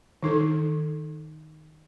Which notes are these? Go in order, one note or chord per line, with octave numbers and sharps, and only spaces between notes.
D#3 D#4 A4